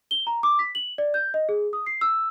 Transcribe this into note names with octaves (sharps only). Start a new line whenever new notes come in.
G7
A#5
D6
B6
F#7
D5
G6
D#5
G#4
D#6
C7
E6